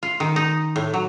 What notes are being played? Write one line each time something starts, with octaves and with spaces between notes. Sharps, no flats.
F4
D#3
D#4
A2
F#3